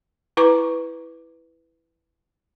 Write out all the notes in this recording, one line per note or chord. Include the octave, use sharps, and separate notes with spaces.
E4 B4 A#5 C#6 D6